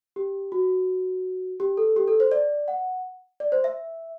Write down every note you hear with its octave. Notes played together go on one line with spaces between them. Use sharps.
G4
F#4
G4
A4
G4
A4
C5
D5
F#5
D5
C5
E5